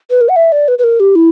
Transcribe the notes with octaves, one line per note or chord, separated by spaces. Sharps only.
B4
A#4
F#5
E5
D5
B4
B4
A#4
G4
E4